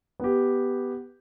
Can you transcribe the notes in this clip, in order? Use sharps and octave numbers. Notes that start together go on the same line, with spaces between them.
B3 G4